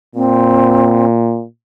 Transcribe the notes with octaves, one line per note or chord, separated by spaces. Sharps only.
A#2 C4